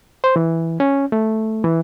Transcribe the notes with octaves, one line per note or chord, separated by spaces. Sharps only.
C5
E3
C#4
A3
E3